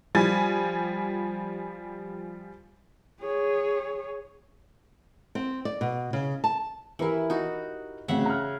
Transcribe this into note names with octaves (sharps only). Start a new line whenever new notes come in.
F3 G3 G#5 A6
G#4 C#5
C4
D5
B2
C#3
A5
E3 E4 G4 A#4
D#4 F#4
A1 D2 C#3 C4 E5 F#5
A#5 F6